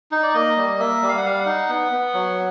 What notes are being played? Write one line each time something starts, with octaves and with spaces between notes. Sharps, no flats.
D#4
D5
A#3 D#5
G3
A#3 E5
G3
F5
F#5
G3 F5
F#5
D#4
B3
B3
F#3